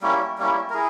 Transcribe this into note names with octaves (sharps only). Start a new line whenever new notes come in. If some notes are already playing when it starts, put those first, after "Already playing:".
G3 A#3 C#4 E4
G3 A#3 C#4 E4
A#4
E4 G#4